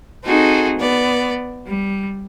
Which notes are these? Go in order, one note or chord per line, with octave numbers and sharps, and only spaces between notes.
C4 D#4 F#4 G#4 A4
B3 D5
G3